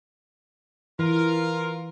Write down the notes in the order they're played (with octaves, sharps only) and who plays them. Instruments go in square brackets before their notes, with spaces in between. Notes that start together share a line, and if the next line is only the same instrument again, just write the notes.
[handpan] E3 [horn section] F4 A#4